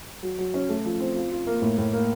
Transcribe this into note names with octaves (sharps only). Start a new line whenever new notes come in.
F#3
F#3
C#4
A3
F3
C4
F4
F4
A#3
A2
A2
A#3